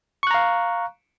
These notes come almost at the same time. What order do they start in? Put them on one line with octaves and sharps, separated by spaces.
C#6 F#6 A#5 F5